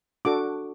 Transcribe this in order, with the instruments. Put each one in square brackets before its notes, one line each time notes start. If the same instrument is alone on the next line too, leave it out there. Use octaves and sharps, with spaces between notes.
[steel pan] D4 F#4 A4 D6